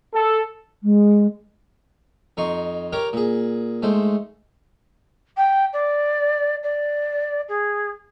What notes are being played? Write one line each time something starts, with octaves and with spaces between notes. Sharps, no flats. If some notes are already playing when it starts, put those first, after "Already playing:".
A4
G#3
F2 D#4 C6 C#6
G4 A#4 C#5 A#5 D6
A#2 G#4
G#2 A3 C5
G5
D5
D5
G#4